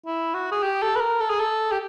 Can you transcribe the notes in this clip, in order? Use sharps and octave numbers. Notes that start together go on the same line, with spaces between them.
E4
F#4
G#4
G4
A4
B4
A#4
A4
G#4
A4
G4